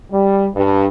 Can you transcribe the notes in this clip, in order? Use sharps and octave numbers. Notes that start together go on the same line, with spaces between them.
G3
G2